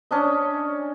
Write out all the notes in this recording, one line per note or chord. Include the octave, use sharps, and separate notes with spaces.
C#4 D4 D#5